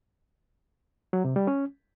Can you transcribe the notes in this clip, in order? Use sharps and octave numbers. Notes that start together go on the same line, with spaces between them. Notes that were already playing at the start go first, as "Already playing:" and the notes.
F#3
C3
G3
C#4